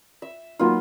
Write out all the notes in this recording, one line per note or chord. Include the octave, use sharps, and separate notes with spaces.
E5
F#3 A#3 B3 D#4 F4